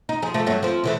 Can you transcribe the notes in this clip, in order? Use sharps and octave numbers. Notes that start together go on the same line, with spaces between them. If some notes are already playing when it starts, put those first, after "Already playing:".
D#4
F3 G#4
F3 A3
G2 F#3 A3
F3 C4
C#3 E3 A3